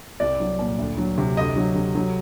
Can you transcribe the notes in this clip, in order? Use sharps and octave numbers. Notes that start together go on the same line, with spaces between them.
C2 D5
F#3
A#2
D2
F#3
C3
D2 D#5
F#3
C3
F#3